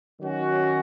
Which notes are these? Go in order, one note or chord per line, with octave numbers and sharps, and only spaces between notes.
D#3 F#3 C#4 F#4